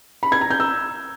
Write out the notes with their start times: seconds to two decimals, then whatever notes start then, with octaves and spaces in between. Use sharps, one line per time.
0.23 B5
0.32 G#6
0.41 A#5
0.51 G6
0.60 E6